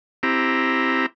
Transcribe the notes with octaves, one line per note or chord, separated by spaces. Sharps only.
C4 E4 G4 A#5